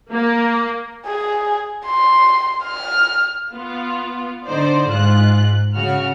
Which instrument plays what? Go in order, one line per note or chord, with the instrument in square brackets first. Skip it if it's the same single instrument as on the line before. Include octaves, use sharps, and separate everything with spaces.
[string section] A#3
[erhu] G#4
C6
F6
[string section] B3 F4
D3 D#4 C5 D5
G#2 F4 F#6
C#3 F#4 F6